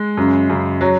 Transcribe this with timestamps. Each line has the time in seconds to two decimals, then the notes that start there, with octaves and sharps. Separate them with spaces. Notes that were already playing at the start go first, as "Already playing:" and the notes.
Already playing: G#3
0.17 F#2 C#3
0.49 F#2 C#3
0.81 F#3